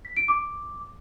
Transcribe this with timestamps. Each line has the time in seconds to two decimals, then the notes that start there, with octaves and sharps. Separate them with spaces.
0.05 B6
0.17 D7
0.28 D6